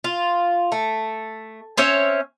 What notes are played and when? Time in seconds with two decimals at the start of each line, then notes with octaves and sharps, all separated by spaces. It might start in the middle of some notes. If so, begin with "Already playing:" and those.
0.04 F4
0.72 A3
1.78 C4 C#4 C#5 E5